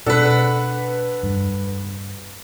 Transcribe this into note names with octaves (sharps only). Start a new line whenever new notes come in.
B2 D4 A4 B4 F#5
G2